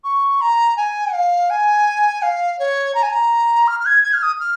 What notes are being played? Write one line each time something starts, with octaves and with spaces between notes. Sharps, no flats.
C#6
A#5
G#5
F5
G#5
F5
C#5
A#5
G#5
A#5
F6
F6
G#6
G#6
F6
D#6
F6